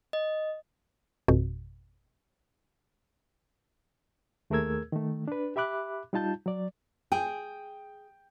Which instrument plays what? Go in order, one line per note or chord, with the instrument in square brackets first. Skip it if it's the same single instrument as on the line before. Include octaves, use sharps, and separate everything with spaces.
[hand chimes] D#5
[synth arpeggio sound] G#1 F2 B2
[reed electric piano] D#2 A3 G#4 A#4 E6 G#6
D#3 A3
D4 B4
G4 E5 B5 D6 F#6
G3 D#4 F4 A5 G6
F#3 D5
[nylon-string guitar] G#4 [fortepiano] G5